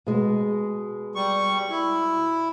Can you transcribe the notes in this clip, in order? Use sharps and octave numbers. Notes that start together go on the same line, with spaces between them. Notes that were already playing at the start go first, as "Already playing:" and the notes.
B2 G#3
G3 C#6
E4